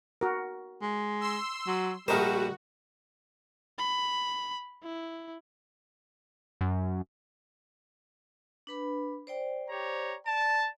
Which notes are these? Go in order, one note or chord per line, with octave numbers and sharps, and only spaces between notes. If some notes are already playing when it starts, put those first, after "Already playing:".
F#4 A#4
G#3
C6 E6
F#3
A#1 G3 A3 F#4 A#4 C5 D#5
B5
E4
F#2
D4 B4 B5
C5 D5 G5
G4 C#5 A#5
D5 A5